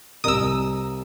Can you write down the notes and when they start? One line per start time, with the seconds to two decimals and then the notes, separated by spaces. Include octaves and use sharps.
0.24 C2 C3 A#4 D#5 D#6 E6